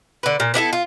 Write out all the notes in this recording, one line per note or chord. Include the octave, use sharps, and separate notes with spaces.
D3 B4
A#2
B3 D4 E4 A4
F4